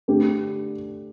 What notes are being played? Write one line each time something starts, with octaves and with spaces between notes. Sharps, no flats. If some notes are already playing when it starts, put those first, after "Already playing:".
D3 A3 D4 G4